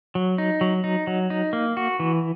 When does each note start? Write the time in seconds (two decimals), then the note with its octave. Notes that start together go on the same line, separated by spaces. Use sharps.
0.15 F#3
0.38 D#4
0.61 F#3
0.84 D#4
1.07 F#3
1.30 D#4
1.53 A#3
1.77 F#4
2.00 E3